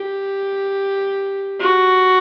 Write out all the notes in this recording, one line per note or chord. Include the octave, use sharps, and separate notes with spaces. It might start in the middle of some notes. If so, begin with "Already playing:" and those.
Already playing: G4
F#4